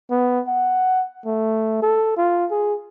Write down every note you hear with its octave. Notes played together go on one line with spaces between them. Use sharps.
B3
F#5
A3
A4
F4
G#4